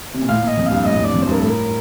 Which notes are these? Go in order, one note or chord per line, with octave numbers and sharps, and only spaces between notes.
C3
A#2
A2 F5
A#2
D#5
F2
G2 F5
A2 D#5
G2
D5
F2
C5
G2
A#4
A2 A4
A#4